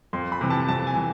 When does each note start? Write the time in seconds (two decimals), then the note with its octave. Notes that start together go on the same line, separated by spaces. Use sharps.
0.13 F2 C6
0.32 B5
0.41 C3 E3
0.50 A5
0.68 F2 A5
0.87 G#5
0.96 C3 E3